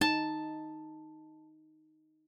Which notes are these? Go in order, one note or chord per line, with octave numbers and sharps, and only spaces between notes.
D#4 A5